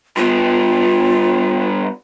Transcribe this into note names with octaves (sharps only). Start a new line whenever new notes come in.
G2 B3 F4